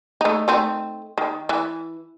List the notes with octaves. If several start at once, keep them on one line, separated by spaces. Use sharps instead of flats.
A3 D#4
A3 C4 D#4
D#3
E3